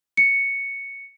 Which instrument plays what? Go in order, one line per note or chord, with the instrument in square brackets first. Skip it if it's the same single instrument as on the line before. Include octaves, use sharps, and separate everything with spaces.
[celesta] C#7